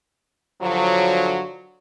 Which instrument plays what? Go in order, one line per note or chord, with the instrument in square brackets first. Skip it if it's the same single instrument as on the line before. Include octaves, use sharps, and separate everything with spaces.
[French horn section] G2 D3 F3 F#3